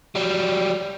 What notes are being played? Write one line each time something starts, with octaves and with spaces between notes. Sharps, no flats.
F#3 G3